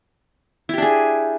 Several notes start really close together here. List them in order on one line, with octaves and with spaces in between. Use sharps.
E4 G4 D4 G#4